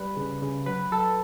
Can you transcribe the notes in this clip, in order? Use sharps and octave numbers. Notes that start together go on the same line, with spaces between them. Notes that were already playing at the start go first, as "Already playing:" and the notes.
Already playing: G3 B4
C#3
C#3
F#3 B4
F#3 A4